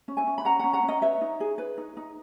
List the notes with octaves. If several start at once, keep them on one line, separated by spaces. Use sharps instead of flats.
C#4
E5 G#5
C#4
B5
C#4 F#5 A#5
C#4 F#5 A#5
F#5 A#5
C#4
D#5 F#5
B4 C#5 E5
D#4
G#4
B4
D#4
D#4